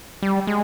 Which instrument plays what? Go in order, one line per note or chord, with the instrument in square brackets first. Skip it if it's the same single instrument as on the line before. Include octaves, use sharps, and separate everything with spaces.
[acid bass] G3
G#3